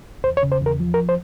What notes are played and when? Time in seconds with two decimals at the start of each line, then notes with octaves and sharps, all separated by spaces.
0.24 E2 C5
0.37 C#5
0.43 C#3
0.52 C5
0.61 E2
0.66 A#4
0.80 F3
0.94 A#4
1.09 C5